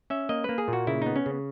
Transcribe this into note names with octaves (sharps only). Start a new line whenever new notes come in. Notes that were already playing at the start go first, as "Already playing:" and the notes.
C#4 E5
A#3 D#5
A#3 B4
G#4
A#2 F#4
C#3 E4
B3 D#4
C#4
C#3